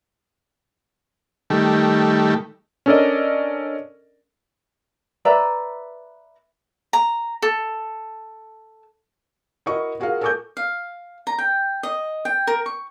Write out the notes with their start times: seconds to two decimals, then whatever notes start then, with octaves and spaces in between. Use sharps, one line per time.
1.50 D#3 G3 A3
2.86 C#4 D4 A4 A#4 D5 D#5
5.25 B4 D5 E5 A#5
6.93 A#5
7.42 A4
9.66 E4 F#4 A#4 D#5 C#6
10.00 F4 F#4 G#4 A#4 F5
10.21 A4 A#4 G#5 C#6 D6 G6
10.57 F5
11.27 A#5
11.38 G5
11.83 D#5
12.25 G5
12.47 A#4
12.66 C#6